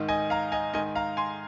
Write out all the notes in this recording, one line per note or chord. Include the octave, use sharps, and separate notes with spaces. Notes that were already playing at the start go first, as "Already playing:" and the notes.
Already playing: G#2 D#3
D#5 G#5
F5 A#5
D#5 G#5
G#2 D#3 D#5 G#5
F5 A#5
G#5 C6